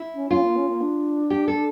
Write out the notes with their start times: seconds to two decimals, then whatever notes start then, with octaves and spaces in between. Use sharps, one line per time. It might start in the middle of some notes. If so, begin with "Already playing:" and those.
Already playing: E4
0.14 C#4
0.30 C#4 F4
0.43 A#3
0.56 C#4
0.69 A#3
0.81 D4
1.30 G4
1.48 A4